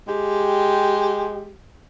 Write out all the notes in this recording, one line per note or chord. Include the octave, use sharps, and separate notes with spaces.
G#3 G4